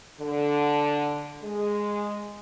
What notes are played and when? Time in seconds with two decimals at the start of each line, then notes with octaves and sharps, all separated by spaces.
0.20 D3
1.43 G#3